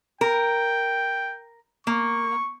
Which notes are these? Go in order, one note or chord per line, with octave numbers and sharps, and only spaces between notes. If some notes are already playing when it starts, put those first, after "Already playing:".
A#4 G5
A#3 C#6